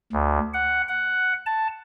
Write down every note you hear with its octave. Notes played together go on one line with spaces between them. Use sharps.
D2
F#5
F#5
A5